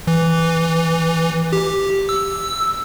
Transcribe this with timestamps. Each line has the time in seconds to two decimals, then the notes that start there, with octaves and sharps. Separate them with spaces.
0.07 E3
1.53 G4
2.09 E6